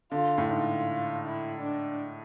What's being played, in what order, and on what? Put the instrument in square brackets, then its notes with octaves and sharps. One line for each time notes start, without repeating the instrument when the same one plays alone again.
[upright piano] D3 [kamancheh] F4
[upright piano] A2
[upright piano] G#2 [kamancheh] F4
[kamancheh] E4
D4